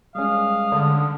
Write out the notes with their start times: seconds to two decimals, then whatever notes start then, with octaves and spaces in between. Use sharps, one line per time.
0.15 G3 G#3 C#4 F5 D#6
0.72 D3